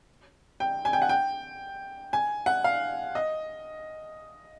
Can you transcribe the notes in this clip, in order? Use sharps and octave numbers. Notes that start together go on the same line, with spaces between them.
G5
G#5
G5
F#5
G5
G#5
F#5
F5
D#5